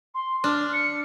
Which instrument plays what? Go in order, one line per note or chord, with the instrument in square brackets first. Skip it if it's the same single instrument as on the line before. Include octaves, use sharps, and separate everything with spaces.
[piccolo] C6
[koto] D4 [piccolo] F6
[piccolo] C#7